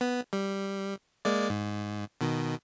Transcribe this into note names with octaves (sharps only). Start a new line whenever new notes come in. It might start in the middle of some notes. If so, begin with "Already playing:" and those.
B3
G3
G#3 A#3 D5
G#2
B2 D#3